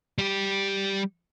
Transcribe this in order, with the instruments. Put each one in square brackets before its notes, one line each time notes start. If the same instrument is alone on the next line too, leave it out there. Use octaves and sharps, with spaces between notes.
[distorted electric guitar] G3 G4